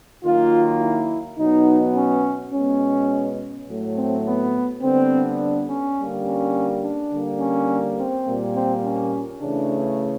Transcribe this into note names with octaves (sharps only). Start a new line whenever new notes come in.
D#3 F#3 A#3 F4
E4
B2 F#3 B3 D#4
C#4
B2 G#3 B3 C#4
A2 F#3 A3
C4
B3
D3 G3 B3 C4
D4
C#4
D3 G3 A#3
C#4
D4
D3 G3 A#3
C#4
C4
A#2 G3 A#3
C4
C#4
C#3 E3 A3 D4